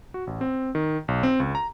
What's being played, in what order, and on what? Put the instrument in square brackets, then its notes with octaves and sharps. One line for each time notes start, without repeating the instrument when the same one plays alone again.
[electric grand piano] F#4
A1
C4
D#3
B1
C4
C#2
A#5